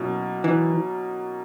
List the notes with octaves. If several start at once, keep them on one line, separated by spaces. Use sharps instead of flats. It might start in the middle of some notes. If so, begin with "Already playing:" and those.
Already playing: B2 F#3 A#3 C#4 E4
E3